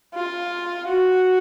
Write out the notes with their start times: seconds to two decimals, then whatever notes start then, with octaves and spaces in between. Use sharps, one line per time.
0.14 F4
0.88 F#4